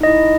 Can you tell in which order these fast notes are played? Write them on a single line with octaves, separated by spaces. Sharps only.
D#4 D#5 E4